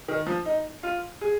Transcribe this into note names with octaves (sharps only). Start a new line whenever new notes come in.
D#3
F3
D#4
F4
G#4